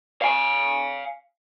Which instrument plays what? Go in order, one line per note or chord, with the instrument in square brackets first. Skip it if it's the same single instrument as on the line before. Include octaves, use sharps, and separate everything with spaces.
[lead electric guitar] F5 G#5